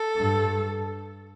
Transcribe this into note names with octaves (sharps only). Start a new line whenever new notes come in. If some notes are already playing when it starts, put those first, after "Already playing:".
Already playing: A4
G2